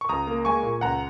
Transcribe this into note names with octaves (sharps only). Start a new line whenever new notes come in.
C#6
C#2 A#5 D#6
A#3
G#3 G#5 C#6
A#2
C#2 F#5 A#5